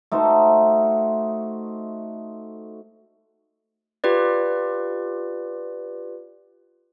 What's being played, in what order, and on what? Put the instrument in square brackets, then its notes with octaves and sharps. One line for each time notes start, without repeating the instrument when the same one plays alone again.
[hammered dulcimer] A3 D#4 F#4 C5
[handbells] F4 G4 B4 D5